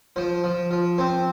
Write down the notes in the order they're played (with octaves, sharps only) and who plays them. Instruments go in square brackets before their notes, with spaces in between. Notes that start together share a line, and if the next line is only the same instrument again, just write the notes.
[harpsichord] F3 C5
F3
F3
C4 C5